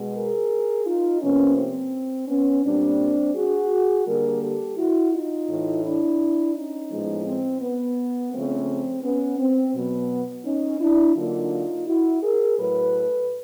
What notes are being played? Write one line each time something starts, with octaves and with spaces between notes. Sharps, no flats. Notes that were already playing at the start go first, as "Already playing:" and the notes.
Already playing: B2 G#3 B3
G#4 A#4
D#4 F4
C3 F3 A#3 B3 C#4
C4
B3 C#4
A#2 G3 A#3 C4 D4
F#4 G#4
D3 G3 A#3 G#4 A#4
G4 A4
E4 F#4
D#4 F4
A2 E3 A3
D4 E4
C#4 D#4
A2 F3 G#3 B3
C4
B3
C#3 F3 A3 C4
B3 C#4
C4
B2 F#3 B3
C#4 D#4
D4 E4
D3 F#3 A#3 D#4 F4
E4 F#4
G#4 A#4
A2 F#3 A3 A4 B4